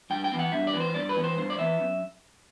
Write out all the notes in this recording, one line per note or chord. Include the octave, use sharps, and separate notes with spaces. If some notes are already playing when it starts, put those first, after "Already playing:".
G2 G5
G5
E3 B3
F#5
G2 E5
D5
E3 B3
C5
G2 D5
B4
E3 B3
C5
G2 C5
D5
E3 B3 E5
F#2